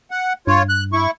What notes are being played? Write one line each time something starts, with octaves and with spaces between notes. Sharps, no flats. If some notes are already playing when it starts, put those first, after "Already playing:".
F#5
G2 F4 C#5
F#6
E4 C#6